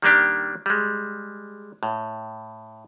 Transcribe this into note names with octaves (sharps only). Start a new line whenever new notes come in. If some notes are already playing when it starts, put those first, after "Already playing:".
D#3 G3 A#3 D4 G4
G3 G#3
A2